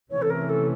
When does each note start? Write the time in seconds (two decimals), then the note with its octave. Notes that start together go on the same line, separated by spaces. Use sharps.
0.11 C3 E3 A3 C#4 C#5
0.22 A4
0.30 A#4
0.49 A4